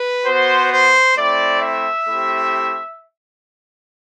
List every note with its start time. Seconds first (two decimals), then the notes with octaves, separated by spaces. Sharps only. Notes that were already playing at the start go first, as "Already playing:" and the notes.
Already playing: B4
0.25 B3 F#4 C5
0.71 C5
1.17 A3 C4 E4 D5
1.62 E5
2.07 A3 C4 E4 G4